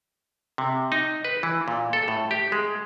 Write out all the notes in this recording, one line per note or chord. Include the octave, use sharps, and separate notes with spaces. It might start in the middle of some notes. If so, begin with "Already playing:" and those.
C3
D#4
B4
E3
A#2
A4
A2
G4
G#3